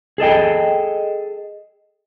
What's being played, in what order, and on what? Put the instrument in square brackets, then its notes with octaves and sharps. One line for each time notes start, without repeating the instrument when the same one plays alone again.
[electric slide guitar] G#4 A4 D#5 G5